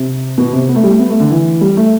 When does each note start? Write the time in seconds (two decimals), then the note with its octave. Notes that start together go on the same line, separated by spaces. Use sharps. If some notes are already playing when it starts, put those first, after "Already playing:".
Already playing: C3
0.38 B2
0.53 C3
0.68 B3
0.75 A3
0.83 G3
0.90 A3
0.99 B3
1.10 A3
1.20 D3
1.30 E3
1.61 G3
1.77 A3